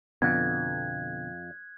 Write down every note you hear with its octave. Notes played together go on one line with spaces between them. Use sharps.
F2 B2 D3 B3 F#6 G#6